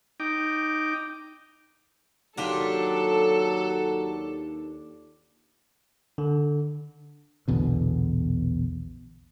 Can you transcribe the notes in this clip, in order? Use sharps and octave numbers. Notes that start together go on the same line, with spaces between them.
D#4 G5 D6
D#2 F#3 D4 F4 G4 A4
D3
A#1 E2 B2 D3